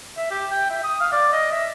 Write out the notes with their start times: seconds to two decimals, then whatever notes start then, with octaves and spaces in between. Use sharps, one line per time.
0.17 E5
0.31 G4
0.51 G5
0.70 E5
0.84 D#6
1.01 F5
1.12 D5
1.33 D#5
1.52 E5